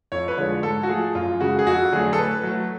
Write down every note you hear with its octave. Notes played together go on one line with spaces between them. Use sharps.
F2 C#5
B4
D3 F3 G#3 C#5
G#2 A4
F#4
F3 A3 G#4
F#2 F4
C#3 G#3 F#4
G#4
F2 F#4
D3 F#3 A3 G#4
A4
A2 B4
F#3 A3